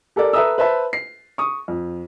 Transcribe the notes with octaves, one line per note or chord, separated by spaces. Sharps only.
G4 A4 A#4 D5
A4 B4 E5 A#5 D#6 E6
B4 C5 E5 A5 B5
C7
C#6 D#6
F2